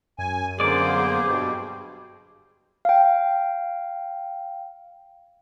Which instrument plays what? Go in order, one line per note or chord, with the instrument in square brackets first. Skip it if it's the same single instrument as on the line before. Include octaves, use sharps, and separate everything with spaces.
[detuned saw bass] F#2 [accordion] G#5
[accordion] D3 A#3 B3 [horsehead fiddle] G#4 C5 [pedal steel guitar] D5 D6
[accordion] G2 B2 G3
[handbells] F5 G5